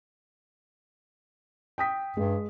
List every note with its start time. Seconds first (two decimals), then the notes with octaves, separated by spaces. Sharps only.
1.78 G5 D#6 B6
2.17 G2 G#3